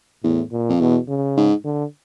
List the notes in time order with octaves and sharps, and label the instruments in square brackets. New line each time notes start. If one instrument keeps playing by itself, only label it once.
[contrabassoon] E2 [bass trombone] A2
[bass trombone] A#2
[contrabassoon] F2
[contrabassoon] E2 [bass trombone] B2
[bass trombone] C#3
[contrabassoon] G#2
[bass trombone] D3